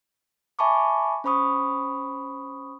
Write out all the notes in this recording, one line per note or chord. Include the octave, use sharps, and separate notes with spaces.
E5 G#5 A5 B5 C#6 D6
C#4 C5 B5 C#6 D#6